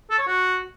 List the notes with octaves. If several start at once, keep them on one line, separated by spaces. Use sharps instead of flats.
A4
C#5
F#4